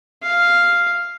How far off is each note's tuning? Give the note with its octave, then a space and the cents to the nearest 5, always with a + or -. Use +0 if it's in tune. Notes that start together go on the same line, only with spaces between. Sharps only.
F5 +0